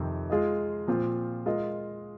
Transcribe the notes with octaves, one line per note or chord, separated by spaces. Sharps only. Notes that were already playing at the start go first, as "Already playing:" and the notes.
Already playing: F2 C3 D#3 C4
G#3 F4 G#4 D#5
A#2 F3 C4 F4 C5
G#3 F4 A#4 D#5